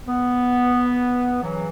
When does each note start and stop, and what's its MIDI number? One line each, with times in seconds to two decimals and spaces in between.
0.08 1.39 59
1.42 1.68 49
1.42 1.68 52
1.42 1.68 54